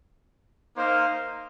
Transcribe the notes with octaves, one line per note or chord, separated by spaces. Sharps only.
A#3 D#4 C5 F5